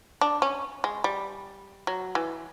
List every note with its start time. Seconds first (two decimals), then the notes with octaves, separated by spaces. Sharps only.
0.21 D4
0.42 C#4
0.84 G#3
1.04 G3
1.87 F#3
2.15 E3